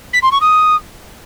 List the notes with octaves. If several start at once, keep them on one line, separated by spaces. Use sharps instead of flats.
B6
C6
C#6
D#6